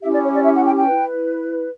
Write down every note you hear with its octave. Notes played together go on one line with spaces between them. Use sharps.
C#4 E4 G4 E5
D5
C#5
D5
E5
F#5
G5
G5
E4 B4